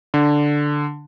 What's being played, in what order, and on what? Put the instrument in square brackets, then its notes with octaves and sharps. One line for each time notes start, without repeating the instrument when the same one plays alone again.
[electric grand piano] D3